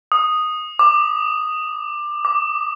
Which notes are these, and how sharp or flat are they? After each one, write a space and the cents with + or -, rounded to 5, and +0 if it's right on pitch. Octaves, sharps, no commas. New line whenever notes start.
D#6 -5
D6 +20
D6 -5